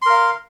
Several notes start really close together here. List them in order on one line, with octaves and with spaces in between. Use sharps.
C6 A#4 F5